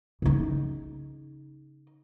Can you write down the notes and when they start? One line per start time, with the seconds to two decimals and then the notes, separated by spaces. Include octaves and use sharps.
0.22 C#3 D#4